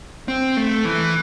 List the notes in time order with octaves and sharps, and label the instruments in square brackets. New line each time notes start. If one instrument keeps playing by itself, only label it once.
[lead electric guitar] C4
A3
E3